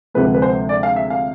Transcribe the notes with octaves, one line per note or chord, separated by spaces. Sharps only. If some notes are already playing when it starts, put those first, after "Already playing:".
D2 C3 F3 G#3 B4
B4
C5
D5
F5
E5
F5